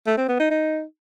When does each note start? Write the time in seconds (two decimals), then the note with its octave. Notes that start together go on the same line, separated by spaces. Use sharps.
0.06 A3
0.18 C4
0.29 B3
0.40 D#4
0.51 D#4